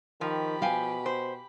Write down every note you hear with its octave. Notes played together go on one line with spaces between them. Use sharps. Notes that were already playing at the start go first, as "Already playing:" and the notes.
D#3 F3 G4 B5
B2 F5 G5 G#5
C5